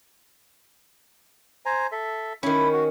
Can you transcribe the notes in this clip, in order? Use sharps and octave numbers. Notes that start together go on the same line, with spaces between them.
C5 G#5 A#5
A4 E5
D#3 C#4 E4 B5
F#4